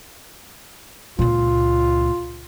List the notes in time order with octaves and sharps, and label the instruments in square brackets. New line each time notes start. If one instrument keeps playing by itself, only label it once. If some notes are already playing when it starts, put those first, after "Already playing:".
[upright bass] C#2 A#2 [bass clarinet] F4